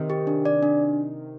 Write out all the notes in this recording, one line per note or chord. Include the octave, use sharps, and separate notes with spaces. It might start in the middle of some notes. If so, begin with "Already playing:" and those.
Already playing: C3 D#3
G4
D4
D5
D4